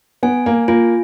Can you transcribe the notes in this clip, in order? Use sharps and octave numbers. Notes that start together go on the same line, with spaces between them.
B3 G#5
A#3
A#3 F4